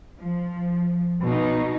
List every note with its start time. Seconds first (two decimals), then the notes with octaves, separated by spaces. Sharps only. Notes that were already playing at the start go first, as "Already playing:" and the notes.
0.19 F3
1.22 B2 D#4